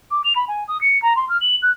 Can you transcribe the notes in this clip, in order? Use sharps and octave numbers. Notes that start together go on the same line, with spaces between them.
D6
F7
B5
G#5
D#6
C#7
A#5
C6
F6
F#7
F#6